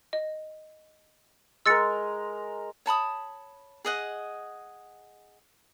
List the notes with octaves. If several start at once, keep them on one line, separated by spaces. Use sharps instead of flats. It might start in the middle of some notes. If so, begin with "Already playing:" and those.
D#5
G#3 A#4 E6 A6 C#7
C#5 A5 B5 D#6
G#4 D#5 F#5